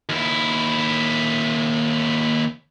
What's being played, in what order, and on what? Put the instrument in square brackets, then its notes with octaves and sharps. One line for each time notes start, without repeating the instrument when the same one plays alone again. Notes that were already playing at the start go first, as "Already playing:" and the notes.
[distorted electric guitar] D#2 E4